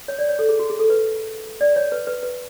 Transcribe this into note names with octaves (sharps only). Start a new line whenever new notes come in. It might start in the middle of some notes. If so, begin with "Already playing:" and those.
C#5
D5
C#5
A4
G#4
F#4
G#4
A4
B4
D5
C#5
B4
B4
B4